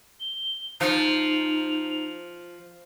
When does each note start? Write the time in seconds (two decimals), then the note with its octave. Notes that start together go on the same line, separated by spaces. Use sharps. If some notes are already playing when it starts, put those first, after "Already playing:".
0.20 G7
0.81 F3 D#4 F7